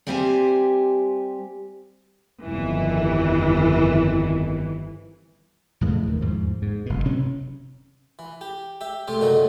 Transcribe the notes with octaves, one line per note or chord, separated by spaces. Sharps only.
G3 C4 G4 C5 E5 G#5
G1 F2 D#3 E3
F2 A2 C#3 E3
D#2 D#3
E2 G#2 F3
G#2
F#1 B2
C3 C#4
E3
G4
G4 E5
C3 A3 C4 G4
F#2 A#2 C#3 F#3 A3 D#4